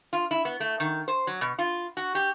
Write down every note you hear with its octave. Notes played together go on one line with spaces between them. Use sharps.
F4
E4
B3
A3
D#3
C5
F#3
B2
F4
F#4
G4